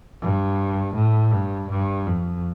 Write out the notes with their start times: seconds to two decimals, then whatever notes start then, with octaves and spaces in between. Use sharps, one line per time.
0.22 G2
0.96 A2
1.32 G2
1.70 G2
2.06 F2